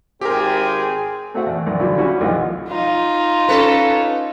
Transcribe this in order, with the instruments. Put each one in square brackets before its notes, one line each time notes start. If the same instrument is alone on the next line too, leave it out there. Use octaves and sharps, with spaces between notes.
[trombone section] G#1 C4 G#4 [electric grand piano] G4 A#4
[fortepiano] A3 C4 F#4 E5 F#5
E2
A#1 F#2
D3 F#3 G3 E4 F4
C#4 E4 F#4 G4
B1 F3 F#5
[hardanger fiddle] D#4 F4
[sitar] C#4 A4 B4